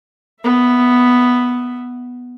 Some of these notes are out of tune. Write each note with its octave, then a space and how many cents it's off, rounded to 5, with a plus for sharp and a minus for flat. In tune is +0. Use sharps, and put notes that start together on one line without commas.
B3 +0 E5 +10